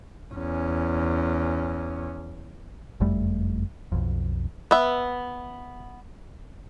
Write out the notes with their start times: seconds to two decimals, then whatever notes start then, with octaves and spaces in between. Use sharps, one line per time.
0.34 E2 C#4
3.00 F#1 F2 G3 A3
3.92 B1 F2
4.71 B3 E5